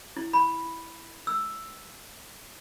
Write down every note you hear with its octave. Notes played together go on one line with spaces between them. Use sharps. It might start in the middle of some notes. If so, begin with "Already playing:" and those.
E4
B5
E6